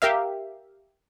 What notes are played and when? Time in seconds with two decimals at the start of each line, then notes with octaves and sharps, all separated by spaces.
0.02 G4 A#4 E5 F5